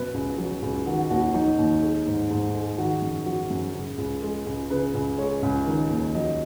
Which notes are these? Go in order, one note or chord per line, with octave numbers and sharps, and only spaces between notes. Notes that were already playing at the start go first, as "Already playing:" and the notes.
Already playing: F#2 B2 B4
C#2
F#3
C#2
D#3 F#4
F#4
D#2 F#4
F#4
F#3 D#4
D#2
G#3
G#2
G#2
G#3
D#3 F#4
F#2
F#3 F#4
F#2
C#3
C#2
G#3
C#2
C#3 B4
C#2
G#3 C#5
C#2
D#3
D#2
F#3 D#5